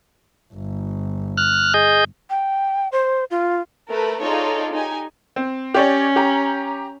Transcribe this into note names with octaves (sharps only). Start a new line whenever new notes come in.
G1
F6 F#6
G#4 D#5 G6
G5
C5
F4
A3 A#4 B4
D#4 F4 G#4 A4 C#5 D5
D#4 G4 G#5
C4
C#4 G4 C#5 D5
G4 A#5